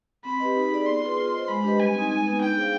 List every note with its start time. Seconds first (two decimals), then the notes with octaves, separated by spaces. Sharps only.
0.25 C4 B5
0.40 G4 B4 D#5
0.56 D#4
0.71 G#4 D5
0.86 B3 C6
1.01 F4 G#4 B4
1.17 F4
1.33 C5 D#5
1.48 G#3 B5
1.63 D4 G4 B4 D#5
1.79 G3 G#5
1.94 C4 D#4
2.11 G#3
2.25 B3 D#4 B4
2.41 D4 G5
2.57 G#4 C5 F5